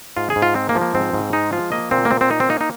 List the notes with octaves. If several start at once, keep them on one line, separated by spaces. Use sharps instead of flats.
G#2 F4
G#4
G#2
F4
G#3 C4
A#3
F3
A#3
G#2 C4
G#2
G#3 D#4
F3 F4
A#3 D#5
A#2 C4
A#3
A#2 C4
C4
A#3 D#4
C4
A#3 D#4
D#4